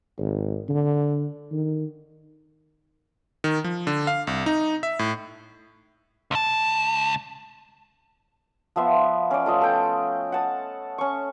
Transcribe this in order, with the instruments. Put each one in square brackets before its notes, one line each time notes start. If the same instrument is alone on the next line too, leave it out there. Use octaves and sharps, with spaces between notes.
[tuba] G#1
D3
D#3
[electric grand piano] D#3
F3
D3
F5
C2
D#4
E5
A2
[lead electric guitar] C#2 A5
[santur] F3 B3 E5 C6
C#4 D5
A3 F4 D#5 F5
A4 G5
F#5 A5 D#6
C#4 C#6